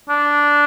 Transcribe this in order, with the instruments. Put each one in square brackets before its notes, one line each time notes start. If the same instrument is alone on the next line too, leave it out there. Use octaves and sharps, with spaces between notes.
[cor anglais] D4